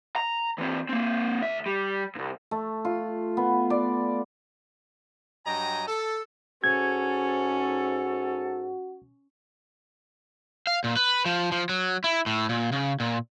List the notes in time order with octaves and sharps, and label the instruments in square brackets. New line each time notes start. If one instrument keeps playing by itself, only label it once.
[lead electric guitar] A#5
E3 C4
A#3 C4
D2 E5
G3
C2 G2
[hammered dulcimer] A3
F4
B3
D5
[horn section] G2 F#3 D#5 G5 G#5 A#5
A4
[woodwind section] G#2 A4 [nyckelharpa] C#4 [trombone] F#4 [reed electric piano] G#6
[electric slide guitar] F5
A#2
B4
F3
F3
F#3
E4
A2
A#2
C#3
A#2